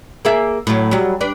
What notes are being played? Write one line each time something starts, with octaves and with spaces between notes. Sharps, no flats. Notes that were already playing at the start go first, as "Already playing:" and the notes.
A#3 G#4 E5
A2 F#3
F#3 G3
D4 B4